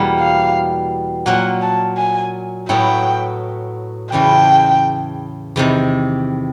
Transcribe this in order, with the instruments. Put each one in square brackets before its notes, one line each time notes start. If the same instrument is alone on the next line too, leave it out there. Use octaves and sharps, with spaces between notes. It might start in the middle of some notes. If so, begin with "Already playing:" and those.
Already playing: [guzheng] E2 B2 G3 A#3
[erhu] F5
[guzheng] A#2 F#3 A#3 [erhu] F#5
[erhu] A5
G#5
[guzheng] A2 F#3 B3 E4 [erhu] G5
[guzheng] E2 C#3 E3 A3 [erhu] G5
[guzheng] E2 C3 D#3